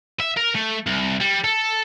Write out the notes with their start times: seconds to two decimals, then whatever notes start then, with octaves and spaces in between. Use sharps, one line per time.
0.20 E5
0.37 A#4
0.55 A3
0.87 C2
1.21 G3
1.44 A4